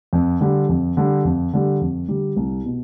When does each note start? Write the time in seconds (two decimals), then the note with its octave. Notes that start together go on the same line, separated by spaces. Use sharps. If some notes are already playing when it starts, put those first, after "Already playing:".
0.13 F2
0.41 D3 G3
0.69 F2
0.97 D3 G3
1.25 F2
1.53 D3 G3
1.81 F2
2.08 D3 G3
2.36 C2
2.66 B2